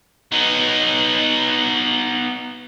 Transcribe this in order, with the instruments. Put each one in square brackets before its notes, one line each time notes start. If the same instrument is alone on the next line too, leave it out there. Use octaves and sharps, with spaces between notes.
[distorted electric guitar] B3 D#4